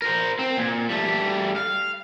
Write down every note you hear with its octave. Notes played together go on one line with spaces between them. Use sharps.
A#4 C5
C4
A#2
G3 A3
F5